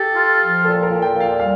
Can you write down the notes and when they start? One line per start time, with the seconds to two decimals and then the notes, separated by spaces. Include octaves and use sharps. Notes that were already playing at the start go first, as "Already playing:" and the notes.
Already playing: G4 A4
0.14 F4
0.39 F3
0.65 A#2 A4
0.82 A#4
0.89 A#2
1.02 G5
1.14 A#2
1.20 F5
1.40 G3 F5